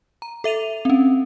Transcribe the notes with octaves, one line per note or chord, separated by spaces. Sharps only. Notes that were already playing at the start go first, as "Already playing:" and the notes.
A#5
A4 E5 D#7 F7
C4 C#4